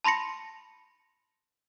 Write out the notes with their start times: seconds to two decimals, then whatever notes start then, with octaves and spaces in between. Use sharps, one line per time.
0.04 A5 B5 C6 A#6 C#7